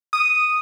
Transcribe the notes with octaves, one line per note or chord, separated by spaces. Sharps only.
D#6